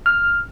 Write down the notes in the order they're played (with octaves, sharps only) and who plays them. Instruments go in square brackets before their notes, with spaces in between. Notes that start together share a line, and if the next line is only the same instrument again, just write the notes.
[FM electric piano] F6